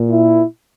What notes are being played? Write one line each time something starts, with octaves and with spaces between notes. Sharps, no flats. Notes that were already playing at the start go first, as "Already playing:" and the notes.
Already playing: A#2
E4